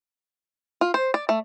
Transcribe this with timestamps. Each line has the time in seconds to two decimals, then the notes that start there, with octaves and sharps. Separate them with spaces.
0.81 F4
0.94 C5
1.14 D5
1.29 A3